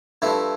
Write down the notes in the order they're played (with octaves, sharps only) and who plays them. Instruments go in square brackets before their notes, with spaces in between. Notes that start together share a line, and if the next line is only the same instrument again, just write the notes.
[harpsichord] G2 F3 A3 E4